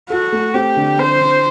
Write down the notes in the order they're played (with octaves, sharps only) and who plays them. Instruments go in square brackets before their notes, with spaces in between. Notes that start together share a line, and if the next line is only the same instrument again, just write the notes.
[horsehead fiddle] F#4 [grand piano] A4
[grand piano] A3
[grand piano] C4 [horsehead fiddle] G4
[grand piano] D3
[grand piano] C4 [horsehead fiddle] C5
[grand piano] D3